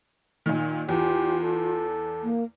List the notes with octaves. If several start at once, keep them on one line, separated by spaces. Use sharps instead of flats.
A#2 D#3
E2 F4 G4
A4
A#3